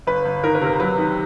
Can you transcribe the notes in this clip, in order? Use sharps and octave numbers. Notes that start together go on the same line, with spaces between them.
G1 B4
G1
D#3 A#4
B4
C3 A#4
F#3 B4
D#3